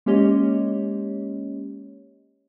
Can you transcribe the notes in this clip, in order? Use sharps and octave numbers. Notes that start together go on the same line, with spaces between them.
G#3 A#3 C#4 G4 C#5 D#5